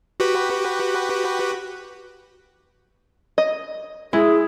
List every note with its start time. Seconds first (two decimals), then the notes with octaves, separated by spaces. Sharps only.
0.20 F#4 G4 B4
3.38 D#5
4.13 G#3 E4 G#4